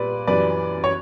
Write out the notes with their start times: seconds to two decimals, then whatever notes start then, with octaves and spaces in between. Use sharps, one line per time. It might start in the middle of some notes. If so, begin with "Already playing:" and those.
Already playing: A#2 G3 B4 D5
0.27 F#2 E3 G3 B4 D5
0.84 C#5